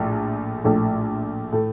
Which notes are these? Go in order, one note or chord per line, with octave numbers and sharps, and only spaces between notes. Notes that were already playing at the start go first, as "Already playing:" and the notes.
Already playing: A#1 A2 A3
A#1 A2 A3
A2 A3